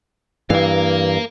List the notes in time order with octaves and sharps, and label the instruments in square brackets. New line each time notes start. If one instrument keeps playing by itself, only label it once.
[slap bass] G2 [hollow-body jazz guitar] E3 [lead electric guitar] A#4 F5